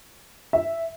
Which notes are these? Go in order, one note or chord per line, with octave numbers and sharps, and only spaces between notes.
E5